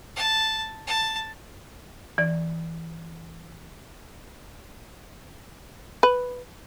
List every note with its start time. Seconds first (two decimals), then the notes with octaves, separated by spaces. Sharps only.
0.16 A5
0.87 A5
2.18 E3 D5
6.03 B4